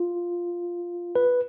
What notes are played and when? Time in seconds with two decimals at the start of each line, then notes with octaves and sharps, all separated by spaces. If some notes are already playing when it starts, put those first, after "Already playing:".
Already playing: F4
1.16 B4